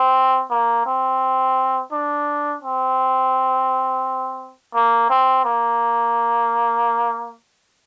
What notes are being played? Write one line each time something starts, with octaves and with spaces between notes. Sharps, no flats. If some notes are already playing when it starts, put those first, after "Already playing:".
Already playing: C4
A#3
C4
D4
C4
A#3
C4
A#3